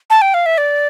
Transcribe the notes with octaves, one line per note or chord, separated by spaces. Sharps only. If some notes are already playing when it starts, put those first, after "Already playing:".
A5
G5
F5
E5
D5